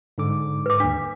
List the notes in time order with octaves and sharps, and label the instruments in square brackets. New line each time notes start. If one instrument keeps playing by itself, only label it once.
[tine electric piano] G#2 D3 D6
[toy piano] B4 D6
[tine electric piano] D#2 B6 [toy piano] D4